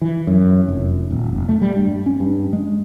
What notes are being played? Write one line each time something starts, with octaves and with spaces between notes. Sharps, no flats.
E3
F#2
F1
D#1
F1
A3
G3
G2
C#4
G2
G#3